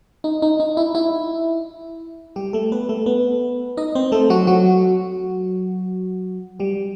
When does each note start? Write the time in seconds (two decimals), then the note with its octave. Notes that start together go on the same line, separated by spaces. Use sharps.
0.24 D#4
0.42 D#4
0.60 D#4
0.77 E4
0.95 E4
2.36 G3 G4
2.53 A3 A4
2.72 B3 B4
2.89 A3 A4
3.06 B3 B4
3.77 D#4 D#5
3.95 C4 C5
4.12 A3 A4
4.30 F#3 F#4
4.47 F#3 F#4
6.59 G3 G4